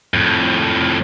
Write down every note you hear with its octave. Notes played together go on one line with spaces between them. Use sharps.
F2 A2